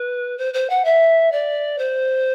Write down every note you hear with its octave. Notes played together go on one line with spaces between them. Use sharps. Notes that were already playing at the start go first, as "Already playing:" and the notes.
Already playing: B4
C5
C5
F#5
E5
D5
C5